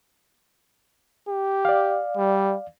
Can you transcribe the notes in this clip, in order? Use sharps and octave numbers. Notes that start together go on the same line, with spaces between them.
G4
D5 F5
G3